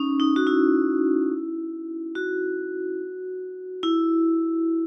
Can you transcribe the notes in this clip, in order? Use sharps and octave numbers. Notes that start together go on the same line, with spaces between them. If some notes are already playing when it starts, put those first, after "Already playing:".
Already playing: C#4 D#4
D#4
F#4
E4
F#4
E4